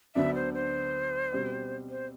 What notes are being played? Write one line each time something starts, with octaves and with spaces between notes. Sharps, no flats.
D2 D3 F#3 B3 D4 E5
C5
C5
B2 G3 C4
C5